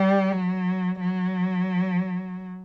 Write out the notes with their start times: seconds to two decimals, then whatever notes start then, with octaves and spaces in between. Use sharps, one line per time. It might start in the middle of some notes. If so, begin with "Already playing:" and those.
Already playing: G3
0.32 F#3
1.01 F#3